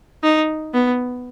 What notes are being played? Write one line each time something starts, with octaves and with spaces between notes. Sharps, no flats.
D#4
B3